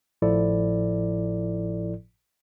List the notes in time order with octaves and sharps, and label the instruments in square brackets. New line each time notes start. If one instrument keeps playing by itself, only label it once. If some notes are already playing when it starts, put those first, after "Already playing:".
[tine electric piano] G#1 A2 F3 E4 A4 D5